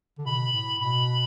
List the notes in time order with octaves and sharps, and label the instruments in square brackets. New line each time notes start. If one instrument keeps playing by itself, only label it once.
[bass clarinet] D3
[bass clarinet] B2 [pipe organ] B5
[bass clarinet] A2
[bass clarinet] B2 [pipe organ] B5